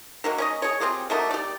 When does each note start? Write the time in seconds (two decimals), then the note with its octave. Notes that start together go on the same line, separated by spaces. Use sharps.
0.24 D#3 F#3 A#3
0.38 C#4 C#5 D#5
0.62 G#4 C#5
0.80 C4 F4 G4 G#4
1.10 F#3 A3 A#3 D#4
1.31 G4 D5